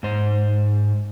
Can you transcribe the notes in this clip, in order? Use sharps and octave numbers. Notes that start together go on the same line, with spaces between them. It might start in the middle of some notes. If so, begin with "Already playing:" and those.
G#2 C5